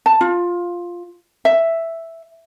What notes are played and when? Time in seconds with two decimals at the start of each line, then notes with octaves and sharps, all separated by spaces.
0.06 A5
0.21 F4
1.45 E5